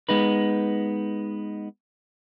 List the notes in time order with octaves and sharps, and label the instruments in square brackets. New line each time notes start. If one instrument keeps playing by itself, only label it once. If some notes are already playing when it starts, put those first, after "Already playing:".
[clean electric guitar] G#3 B3 D#4 B4